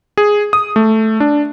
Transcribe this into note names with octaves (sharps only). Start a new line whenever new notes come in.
G#4
D#6
A3
D4